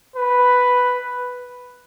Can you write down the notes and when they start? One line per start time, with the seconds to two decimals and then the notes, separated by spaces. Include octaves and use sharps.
0.16 B4